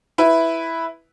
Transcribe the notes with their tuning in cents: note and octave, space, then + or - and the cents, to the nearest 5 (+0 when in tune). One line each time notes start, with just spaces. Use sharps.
E4 +0 B4 +0